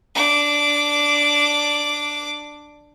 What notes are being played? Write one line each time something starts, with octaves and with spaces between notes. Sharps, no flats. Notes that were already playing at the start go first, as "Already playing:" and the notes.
D4 D6